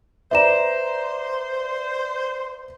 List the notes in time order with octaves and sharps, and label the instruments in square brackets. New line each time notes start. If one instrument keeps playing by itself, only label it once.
[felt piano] B4 D5 A#5 [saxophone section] C5 [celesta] E5 E7